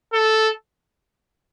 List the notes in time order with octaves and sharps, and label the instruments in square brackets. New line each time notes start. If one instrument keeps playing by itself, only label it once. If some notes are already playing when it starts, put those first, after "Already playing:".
[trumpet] A4